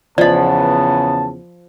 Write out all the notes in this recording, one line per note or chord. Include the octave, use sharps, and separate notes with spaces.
E2 C#3 F3 B3 D5 D#5 A5 B5